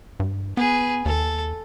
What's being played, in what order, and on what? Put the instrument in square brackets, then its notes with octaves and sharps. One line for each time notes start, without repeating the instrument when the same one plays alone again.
[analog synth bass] G2
[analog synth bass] B3 [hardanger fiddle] G#4 B4
[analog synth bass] D#2 [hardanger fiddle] A4